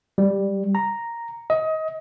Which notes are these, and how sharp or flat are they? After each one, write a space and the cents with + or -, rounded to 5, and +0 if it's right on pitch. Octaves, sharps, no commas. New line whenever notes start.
G3 +5
A#5 +0
D#5 +25